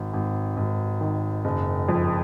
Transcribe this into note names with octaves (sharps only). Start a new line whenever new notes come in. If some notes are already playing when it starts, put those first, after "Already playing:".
Already playing: G#1
G#1
G#1
D#3
F#1
F2